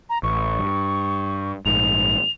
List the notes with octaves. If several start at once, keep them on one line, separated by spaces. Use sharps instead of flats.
A#5
A1 C#6
G2
A#1 G#2 F7